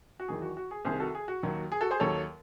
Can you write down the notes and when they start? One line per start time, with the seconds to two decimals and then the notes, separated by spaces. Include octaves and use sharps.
0.20 F#4
0.28 E2 D#3 F#3 G#4
0.42 F#4
0.57 F#4
0.71 G#4
0.85 C2 C3 D#3 G#4 C5
0.99 F#4 A4
1.15 G#4
1.28 F#4
1.43 D#2 D#3 F#3
1.72 G#4
1.81 F#4 A4
1.91 G#4 C5
2.00 D#2 D#3 F#3 A4 C#5